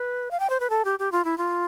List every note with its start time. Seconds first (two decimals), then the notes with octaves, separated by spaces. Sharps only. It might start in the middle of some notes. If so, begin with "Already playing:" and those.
Already playing: B4
0.31 F5
0.40 G5
0.50 C5
0.60 B4
0.70 A4
0.85 G4
0.99 G4
1.12 F4
1.25 E4
1.38 F4